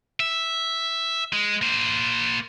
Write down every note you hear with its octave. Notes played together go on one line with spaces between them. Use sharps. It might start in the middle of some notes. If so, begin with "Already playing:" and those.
E5
G#3
A#3 C5